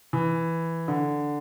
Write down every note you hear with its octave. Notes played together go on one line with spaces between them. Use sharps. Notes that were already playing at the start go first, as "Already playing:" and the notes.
E3
D3